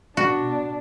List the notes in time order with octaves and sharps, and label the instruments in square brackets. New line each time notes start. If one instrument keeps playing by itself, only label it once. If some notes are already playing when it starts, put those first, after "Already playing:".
[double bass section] B2 [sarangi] D4 [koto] F#4